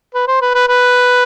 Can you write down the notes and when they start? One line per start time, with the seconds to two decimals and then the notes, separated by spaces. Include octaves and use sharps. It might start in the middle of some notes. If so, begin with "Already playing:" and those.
0.14 B4
0.28 C5
0.41 B4
0.54 B4
0.68 B4